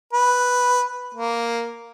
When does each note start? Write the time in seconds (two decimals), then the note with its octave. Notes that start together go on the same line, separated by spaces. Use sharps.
0.13 B4
1.15 A#3